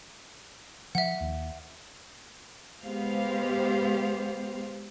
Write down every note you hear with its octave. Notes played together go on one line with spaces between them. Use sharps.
F3 E5 F#5
D#2
G#3 B3 G4 C5 F5